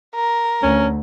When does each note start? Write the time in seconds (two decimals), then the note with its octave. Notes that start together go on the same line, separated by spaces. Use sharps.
0.15 A#4
0.63 D2 C#4